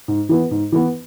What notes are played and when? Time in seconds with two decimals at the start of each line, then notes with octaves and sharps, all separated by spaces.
0.08 G#2
0.29 E3 B3
0.51 G#2
0.72 E3 B3